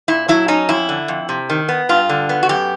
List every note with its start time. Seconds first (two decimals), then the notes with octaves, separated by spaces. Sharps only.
0.08 A#2 E4
0.28 F#3 E4
0.48 C#4 D#4
0.69 F2 E4
0.89 D3
1.08 F2
1.29 C3
1.50 D#3
1.69 B3
1.89 G2 F4
2.09 D3
2.29 B3
2.43 F#4
2.49 F#2 G4